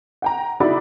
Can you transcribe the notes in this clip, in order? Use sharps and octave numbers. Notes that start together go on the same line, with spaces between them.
F#5 G5 A#5
D#4 E4 F#4 D5 B5 D6